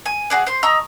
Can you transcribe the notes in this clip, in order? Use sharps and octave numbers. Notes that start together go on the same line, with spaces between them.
G#5
F#4 G#4 D5
C5 C6
D#5 A#5 C#6 E6